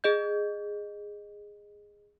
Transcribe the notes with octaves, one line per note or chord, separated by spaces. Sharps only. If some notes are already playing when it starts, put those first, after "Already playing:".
G#4 D#5 G6